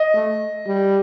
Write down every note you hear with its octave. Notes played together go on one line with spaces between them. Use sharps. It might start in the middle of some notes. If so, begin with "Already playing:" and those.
Already playing: D#5
A3
G3